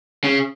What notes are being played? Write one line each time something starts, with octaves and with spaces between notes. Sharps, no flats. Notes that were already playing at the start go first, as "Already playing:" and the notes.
C#3